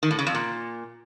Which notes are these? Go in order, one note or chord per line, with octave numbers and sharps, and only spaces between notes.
D#3
A2
C#3
F2
A#2